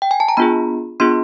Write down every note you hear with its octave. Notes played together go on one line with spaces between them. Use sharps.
G5
G#5
A5
A#5
B3 D4 F4 G#4 B5
B3 D4 F4 G#4 C6